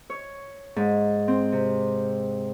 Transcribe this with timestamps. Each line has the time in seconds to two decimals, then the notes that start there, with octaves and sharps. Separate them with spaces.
0.10 C#5
0.76 G#2
1.28 C4
1.52 C3